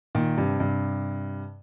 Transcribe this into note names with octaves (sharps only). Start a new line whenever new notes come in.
A#2 D#3
G2 C3
G2 C3